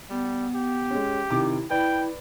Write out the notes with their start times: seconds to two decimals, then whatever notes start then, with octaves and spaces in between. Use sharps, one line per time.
0.10 G3 B3
0.55 G4
0.91 G#3 C#4
1.31 C3 D#3 E4 D6
1.70 E4 B4 D5 G5